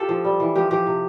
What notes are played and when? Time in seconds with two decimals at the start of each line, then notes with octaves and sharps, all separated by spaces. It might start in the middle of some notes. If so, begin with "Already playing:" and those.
Already playing: F4 G4 A4
0.09 F3
0.25 G3
0.40 E3
0.56 F3 G4
0.71 F3 G4
0.87 C3